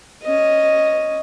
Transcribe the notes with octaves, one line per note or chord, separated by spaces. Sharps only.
C#4 D#5